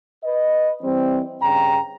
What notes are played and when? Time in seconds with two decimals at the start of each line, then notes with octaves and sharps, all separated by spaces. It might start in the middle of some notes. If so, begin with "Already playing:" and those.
0.24 B4 D#5
0.83 E3 G3 C4
1.42 G2 C#3 G5 A#5